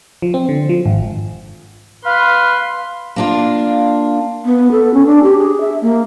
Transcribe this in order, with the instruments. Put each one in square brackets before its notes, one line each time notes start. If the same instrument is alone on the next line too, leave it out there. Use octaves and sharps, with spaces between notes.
[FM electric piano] F3
C4
D3
F3
G#1
[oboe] B4 [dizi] F5 [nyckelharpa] C6 [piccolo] F6
[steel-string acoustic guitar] A#3 D4 F4
[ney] B3
A4
C#4
D4
G4
G#4
E5
A#3